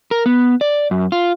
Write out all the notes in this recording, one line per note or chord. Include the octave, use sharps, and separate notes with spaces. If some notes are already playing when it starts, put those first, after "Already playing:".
A#4
B3
D5
F#2
F4